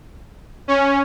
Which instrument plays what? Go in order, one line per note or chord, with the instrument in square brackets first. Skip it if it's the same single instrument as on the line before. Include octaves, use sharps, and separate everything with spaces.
[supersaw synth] C#4